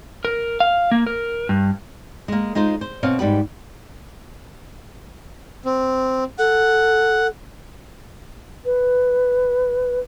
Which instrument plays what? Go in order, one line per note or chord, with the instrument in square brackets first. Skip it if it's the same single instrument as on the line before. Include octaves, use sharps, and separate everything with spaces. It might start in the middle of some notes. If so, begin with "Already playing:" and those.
[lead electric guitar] A#4
F5
A#3
A#4
G2
[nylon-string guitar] G#3 A#3
G#3 D#4 F4 C5
C5
B2 C4 B4 C#5 F5
G#2 G3 G4 B4
[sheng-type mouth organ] C4
[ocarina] A4 [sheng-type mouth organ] F#5
[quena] B4